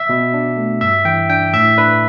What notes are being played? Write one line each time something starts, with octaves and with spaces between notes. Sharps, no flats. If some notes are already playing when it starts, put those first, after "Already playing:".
Already playing: E5
B2
D4
A3
G2 E5
E3 G5
D4 G5
A2 E5
D4 B4